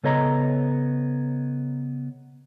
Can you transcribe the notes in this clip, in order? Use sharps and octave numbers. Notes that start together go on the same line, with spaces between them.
C#3 B3 A4 C#5 D#5 A#5